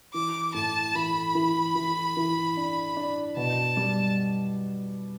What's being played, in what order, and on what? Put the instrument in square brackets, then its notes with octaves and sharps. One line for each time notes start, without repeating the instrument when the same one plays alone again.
[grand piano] E3 [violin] D6
[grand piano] A2 [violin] A5
[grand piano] E3 [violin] B5
[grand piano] E3
E3
E3
D4
D4
[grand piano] B2 [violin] A5
[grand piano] G3